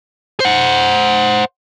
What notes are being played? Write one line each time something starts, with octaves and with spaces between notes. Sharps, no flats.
C5 F#5